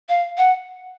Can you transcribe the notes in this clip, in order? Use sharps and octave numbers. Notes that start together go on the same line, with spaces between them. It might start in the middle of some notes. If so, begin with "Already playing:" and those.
F5
F#5